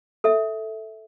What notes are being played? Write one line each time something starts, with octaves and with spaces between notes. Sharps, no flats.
A4 E5